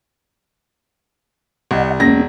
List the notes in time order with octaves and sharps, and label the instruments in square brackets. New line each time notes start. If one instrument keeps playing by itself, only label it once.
[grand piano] C2 [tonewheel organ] D#5 F#5
[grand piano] E1 A#6 [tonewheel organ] A#3 C#4